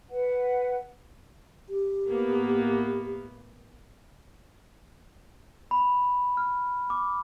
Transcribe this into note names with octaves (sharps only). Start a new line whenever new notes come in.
B4 F#5
G4
A2 A#3 B3
B5
F6
D6